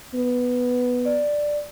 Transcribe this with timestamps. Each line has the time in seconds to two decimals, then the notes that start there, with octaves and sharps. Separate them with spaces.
0.14 B3
1.05 D5